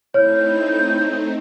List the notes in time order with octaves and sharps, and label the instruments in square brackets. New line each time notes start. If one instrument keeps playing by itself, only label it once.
[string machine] A3 C4 D#4 [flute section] E4 G6 [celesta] C#5 F6